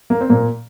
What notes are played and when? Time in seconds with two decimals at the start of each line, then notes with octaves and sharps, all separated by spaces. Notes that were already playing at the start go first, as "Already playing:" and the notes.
0.10 A#3
0.21 C4
0.30 A#2 A#3